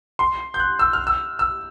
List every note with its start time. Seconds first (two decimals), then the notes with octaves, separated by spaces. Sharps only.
0.19 C6
0.54 G6
0.60 F#6
0.79 E6
0.93 F6
1.07 E6
1.39 E6